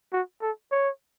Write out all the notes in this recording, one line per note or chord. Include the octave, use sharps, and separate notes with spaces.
F#4
A4
C#5